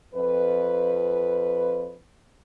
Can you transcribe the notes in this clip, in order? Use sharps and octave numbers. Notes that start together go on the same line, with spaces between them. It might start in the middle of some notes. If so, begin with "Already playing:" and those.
F2 B4